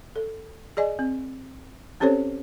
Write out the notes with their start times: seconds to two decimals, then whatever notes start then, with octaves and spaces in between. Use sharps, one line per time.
0.16 A4
0.77 G#4 D5 D#5 G#5
0.99 C4
2.00 C4 C#4 G4 A4 C5 C#5